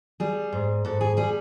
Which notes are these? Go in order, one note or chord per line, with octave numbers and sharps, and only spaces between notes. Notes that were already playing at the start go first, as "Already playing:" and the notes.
G3 G#4
G#2
G#2 A4
G#4
G3 G#4